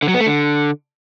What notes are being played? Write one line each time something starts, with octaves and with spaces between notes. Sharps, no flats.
D3
F#3
B3
A3
D3